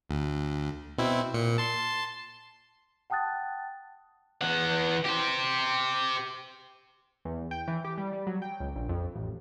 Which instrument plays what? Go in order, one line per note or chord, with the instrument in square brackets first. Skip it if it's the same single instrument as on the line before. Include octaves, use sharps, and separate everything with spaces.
[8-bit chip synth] D2
B2 C4 E4
A#2 C#7
A5 C6
[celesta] F#5 G5 A5 D#6 F#6 A6
[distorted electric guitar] E3 F#5
G4 C5
[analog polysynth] E2
G5
E3
G4
G3
G3
F#3
G5
C#2
A#1
F2
A1